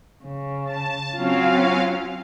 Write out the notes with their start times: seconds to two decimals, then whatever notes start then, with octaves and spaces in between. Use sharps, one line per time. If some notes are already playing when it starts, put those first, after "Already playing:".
0.25 C#3
0.66 A5
1.17 F#3 C4 C#4 F4 F5